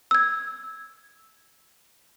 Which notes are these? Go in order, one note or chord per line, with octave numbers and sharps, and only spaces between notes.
E6 G#6